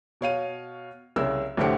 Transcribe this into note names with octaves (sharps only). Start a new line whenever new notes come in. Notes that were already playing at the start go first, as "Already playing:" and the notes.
B2 C#5 F5 D#7
C2 C#3 A#4 E6
C2 A2 D3 C4 G4 C#7